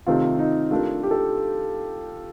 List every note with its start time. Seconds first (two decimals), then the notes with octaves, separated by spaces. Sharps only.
0.06 C3 D#3 A3 C4 F4 G4
0.39 D#4
0.71 A3 D4 F4 G4 A#4
1.03 G4
1.11 A4